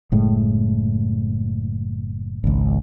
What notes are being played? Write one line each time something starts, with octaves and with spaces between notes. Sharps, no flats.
F#1 A2 G#3
G#1 C#2